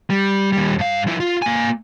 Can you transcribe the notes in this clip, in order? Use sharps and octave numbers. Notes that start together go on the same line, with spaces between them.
G3
D#2 G3
G2 F5
F3 E4
F4
A#3 G#5